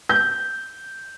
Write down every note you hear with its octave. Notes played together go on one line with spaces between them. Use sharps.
G6